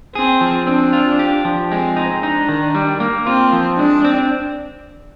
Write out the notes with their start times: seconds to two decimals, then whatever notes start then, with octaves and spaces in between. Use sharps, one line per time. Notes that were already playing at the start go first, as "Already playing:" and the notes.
0.15 C4 G#4
0.41 F3
0.67 C4 D4
0.93 F4
1.19 G4
1.45 F3
1.71 G#3 C4
1.96 D#4
2.23 D4 D#4
2.49 D#3
2.75 G3
3.00 A#3
3.27 C4 F4
3.53 F3
3.78 G#3 D4
4.05 C4